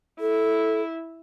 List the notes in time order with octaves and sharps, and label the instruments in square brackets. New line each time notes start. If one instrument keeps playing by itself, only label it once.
[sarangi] E4 [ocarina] A4